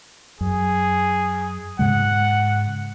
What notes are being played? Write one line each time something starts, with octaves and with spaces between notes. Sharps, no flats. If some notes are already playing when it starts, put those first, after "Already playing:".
F#2 G#4
G#2 C#3 G#3 F#5